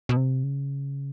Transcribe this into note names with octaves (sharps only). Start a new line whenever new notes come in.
B2
C3
C#3